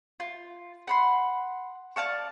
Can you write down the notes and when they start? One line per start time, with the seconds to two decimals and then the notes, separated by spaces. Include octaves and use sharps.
0.20 F4
0.87 F#5 B5 C6
1.96 D5 F5 A5 C#6